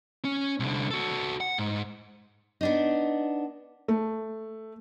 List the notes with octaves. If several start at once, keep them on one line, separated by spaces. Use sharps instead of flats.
C#4
C2 D3
F#4 A4
F#5
G#2
B3 D4 D#4
A3